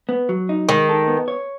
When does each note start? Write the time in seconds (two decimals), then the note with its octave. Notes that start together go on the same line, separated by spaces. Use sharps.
0.09 B3
0.29 F#3
0.49 D#4
0.69 D#3 G#3
0.89 A4
1.08 B3
1.28 C#5